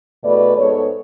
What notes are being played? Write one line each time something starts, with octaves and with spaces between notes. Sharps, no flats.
E2 B2 A3 B4 D5
G#2 G#3 B3 A4 C#5